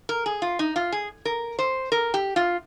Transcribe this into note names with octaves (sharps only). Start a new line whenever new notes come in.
A#4
G#4
F4
D#4
F4
G#4
A#4
C5
A#4
G4
F4